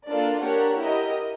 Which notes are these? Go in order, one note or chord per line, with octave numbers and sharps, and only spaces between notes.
A#3 D4 F4 A4 D5
D4 G4 A#4 C#5 F#5
E4 G4 A#4 D#5